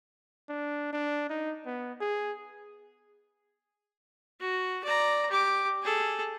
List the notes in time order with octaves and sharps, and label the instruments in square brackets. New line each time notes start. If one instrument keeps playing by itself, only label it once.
[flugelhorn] D4
D4
D#4
B3
G#4
[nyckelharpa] F#4
D5 A#5
G4 D6
G#4 A4